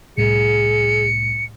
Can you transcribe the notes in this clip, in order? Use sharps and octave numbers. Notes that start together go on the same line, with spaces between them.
C2 A2 G#4 C#7